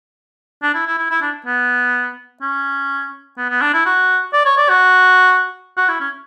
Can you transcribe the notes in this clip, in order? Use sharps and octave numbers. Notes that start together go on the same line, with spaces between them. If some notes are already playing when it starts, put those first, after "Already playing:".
D4
E4
E4
E4
E4
D4
B3
C#4
B3
B3
D4
E4
F#4
D5
C#5
D5
F#4
F#4
E4
C#4